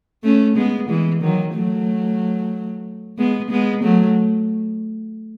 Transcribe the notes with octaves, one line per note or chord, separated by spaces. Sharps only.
A3 C#4
G#3 B3
E3 G#3
D#3 F#3
F#3 A3
G#3 B3
G#3 B3
F#3 A3